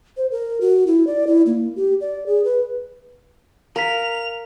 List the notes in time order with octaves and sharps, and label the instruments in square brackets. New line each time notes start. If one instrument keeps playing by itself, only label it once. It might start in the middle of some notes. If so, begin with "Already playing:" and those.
[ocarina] C5
A#4
F#4
E4
D5
E4
A#3
G4
D5
G#4
B4
[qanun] A#4 [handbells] F5 A#5 B6 [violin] F7